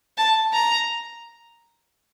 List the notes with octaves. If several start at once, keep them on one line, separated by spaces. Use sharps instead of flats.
A5
A#5